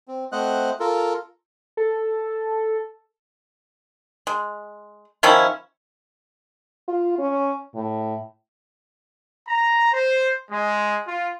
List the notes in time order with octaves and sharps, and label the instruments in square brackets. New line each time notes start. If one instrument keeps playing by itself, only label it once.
[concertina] C4
A3 C4 C5 D#5 F#5 F#6
F4 A4 A#4
[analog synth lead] A4
[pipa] G#3
D#3 F3 C#4 E4
[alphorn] F4
C#4
A2
[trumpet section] A#5
C5
G#3
F4